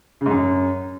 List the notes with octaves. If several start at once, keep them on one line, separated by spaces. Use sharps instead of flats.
C#3
G#2
F#2